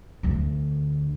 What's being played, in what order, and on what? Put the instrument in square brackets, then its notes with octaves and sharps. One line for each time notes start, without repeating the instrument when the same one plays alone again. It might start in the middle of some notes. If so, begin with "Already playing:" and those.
[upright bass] D2 D4